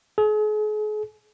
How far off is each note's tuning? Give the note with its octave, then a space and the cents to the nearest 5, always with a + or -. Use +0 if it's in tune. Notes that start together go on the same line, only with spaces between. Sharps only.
G#4 +40